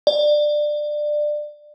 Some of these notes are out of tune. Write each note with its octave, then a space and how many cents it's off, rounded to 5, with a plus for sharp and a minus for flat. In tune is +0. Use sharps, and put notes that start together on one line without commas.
D5 +20